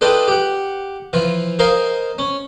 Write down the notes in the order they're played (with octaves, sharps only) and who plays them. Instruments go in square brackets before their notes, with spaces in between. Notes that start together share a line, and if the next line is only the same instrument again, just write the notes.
[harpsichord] D4 F4 A4 B4 D#5 G5
G4 F#5
E3 F3 F4
A#4 C5 D#5 F5 G#5 A#5
C#4